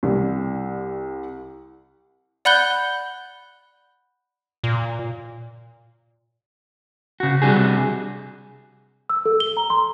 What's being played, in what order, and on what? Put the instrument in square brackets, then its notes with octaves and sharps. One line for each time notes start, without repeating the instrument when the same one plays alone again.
[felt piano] C2 G3
[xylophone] D5 F#5 B5 F#6 G6 G7
[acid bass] A#2
[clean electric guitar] C#3 F#4
C3 G3 D4 F#4 G#4
[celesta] E6
A4
G7
A#5
C6